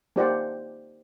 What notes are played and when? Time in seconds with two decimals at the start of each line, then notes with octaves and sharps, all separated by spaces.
0.16 A#3 D#4 G4 C5 D5 F#5